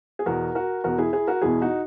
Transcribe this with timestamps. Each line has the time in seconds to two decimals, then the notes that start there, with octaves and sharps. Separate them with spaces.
0.19 G#4
0.26 E2 B2 F#4 A#4
0.55 F#4 A#4
0.84 E2 B2 F#4 A#4
0.98 E4 G#4
1.13 E4 G#4
1.27 F#4 A#4
1.42 E2 B2 E4 G#4
1.61 D#4 F#4